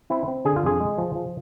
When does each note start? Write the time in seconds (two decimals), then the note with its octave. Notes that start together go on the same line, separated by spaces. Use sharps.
0.10 C4 E4
0.28 C4
0.45 D3 G#4
0.56 F4
0.63 F2 G#4
0.80 G#3
0.98 F3
1.15 F3